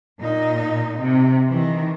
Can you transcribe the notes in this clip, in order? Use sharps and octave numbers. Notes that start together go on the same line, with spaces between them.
A#2 D#4
C3
D#3 E3